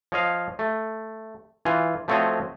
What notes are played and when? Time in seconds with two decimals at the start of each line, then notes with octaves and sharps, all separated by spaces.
0.12 F3 C#5 D#5 F5
0.59 A3
1.65 E3 F4 G#5
2.08 F3 A3 C4 F#4 C#5 D#5